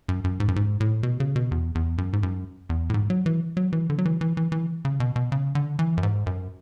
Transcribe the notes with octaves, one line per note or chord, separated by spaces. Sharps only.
F#2
F#2
G#2
F#2
G#2
A2
B2
C#3
B2
E2
E2
F#2
G#2
F#2
E2
A2
G#2
F#3
E3
F#3
E3
D3
F#3
E3
E3
E3
E3
C#3
B2
B2
C#3
D3
E3
F#2
G#2
F#2